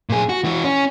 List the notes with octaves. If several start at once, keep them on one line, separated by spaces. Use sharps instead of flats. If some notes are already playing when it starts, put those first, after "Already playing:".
A#2 G#4
F#4
E3 F#4
C#4